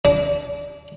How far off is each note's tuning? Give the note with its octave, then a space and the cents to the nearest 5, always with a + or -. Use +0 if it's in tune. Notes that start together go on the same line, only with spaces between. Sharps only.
D4 -25